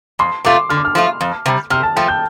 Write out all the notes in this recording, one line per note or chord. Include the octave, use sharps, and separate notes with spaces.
F2 C6
C3 A3 F4 D6
D3 F6
D6
F6
F3 A3 F4
F2
C3 G3
C3 F6
A5
F3 A3 G5
G6